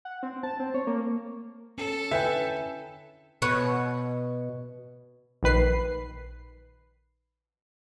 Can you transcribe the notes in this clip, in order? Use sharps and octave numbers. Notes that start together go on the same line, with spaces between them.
F#5
C4
A5
C4
C#5
A#3
C#4 A4
D3 C#4 E4 B4 E5 G5 G#5
B2 B4 C#5 F#5
A#1 D#3 B4 C7